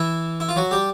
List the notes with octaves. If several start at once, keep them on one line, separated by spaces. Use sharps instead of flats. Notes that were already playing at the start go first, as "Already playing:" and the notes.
Already playing: E3 E4
E4
F4
F#3 F#4
G3 G4